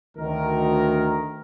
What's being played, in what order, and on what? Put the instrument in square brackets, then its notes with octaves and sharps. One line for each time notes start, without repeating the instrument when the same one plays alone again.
[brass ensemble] D2 D#3 A#4